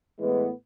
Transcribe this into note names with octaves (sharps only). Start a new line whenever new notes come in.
A2 E3 G#3 B3